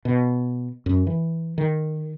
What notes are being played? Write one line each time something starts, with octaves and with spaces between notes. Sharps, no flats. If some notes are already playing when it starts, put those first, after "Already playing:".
B2
F#2
E3
D#3